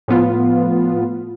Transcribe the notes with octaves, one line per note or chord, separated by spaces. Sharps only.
A2 F3 B3 F4